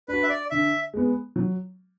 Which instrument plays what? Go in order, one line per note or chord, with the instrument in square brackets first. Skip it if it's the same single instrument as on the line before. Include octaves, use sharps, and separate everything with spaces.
[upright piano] D4 F#4 [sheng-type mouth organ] B4
[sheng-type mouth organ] E5
D5
[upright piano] D3 [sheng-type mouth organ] E5
[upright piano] G#3 B3
F#3